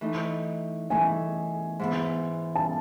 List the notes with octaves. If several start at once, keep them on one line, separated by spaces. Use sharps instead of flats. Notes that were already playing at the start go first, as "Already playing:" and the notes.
E3 A3 D#4
E3 A3 D#4 G#5
G#2 E3 B3
A5